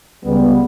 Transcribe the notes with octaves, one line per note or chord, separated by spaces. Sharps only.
C#2 C#3 G3 B3